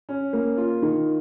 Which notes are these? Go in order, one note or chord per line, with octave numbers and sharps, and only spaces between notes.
C#4
A#3
F4
D#3